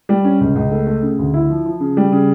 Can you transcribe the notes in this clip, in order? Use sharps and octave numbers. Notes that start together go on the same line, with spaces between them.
G3
C#4
C#2
C#2
A3
A3
C#3
D2
E4
F3
F3
C#3
G3
C#3